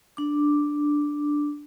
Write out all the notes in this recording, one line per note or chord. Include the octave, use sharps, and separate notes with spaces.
D4 D6